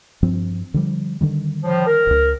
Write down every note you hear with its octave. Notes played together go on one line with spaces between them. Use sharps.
G2 F3 C4
D3 F3 G3
D3 D#3 G3
A2 F3
A#4
D#1 C#2